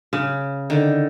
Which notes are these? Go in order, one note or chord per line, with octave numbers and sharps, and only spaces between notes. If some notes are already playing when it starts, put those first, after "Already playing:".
C#3
D3 D#3